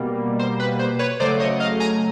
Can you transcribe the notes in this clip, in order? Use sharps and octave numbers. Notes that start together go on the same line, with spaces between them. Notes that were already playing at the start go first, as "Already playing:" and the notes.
Already playing: B2 G3 A#3
C5
B4
C5
B4 C#5
C#3 F#3 A3 C5 D5
C#5 D#5
D#5 F5
G#5 A#5